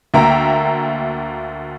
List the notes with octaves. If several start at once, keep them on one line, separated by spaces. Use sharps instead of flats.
D2 A#3 E5 G5 A#5